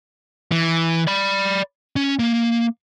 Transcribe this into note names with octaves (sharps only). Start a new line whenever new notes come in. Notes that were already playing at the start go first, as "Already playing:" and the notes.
E3
D5 B5
C#4
A#3